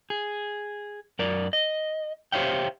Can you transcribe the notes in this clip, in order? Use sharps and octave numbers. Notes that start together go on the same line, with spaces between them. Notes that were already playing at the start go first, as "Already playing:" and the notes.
G#4
F#2 A#4 D5
D#5
G4 C5 C#5 E5 F5 G5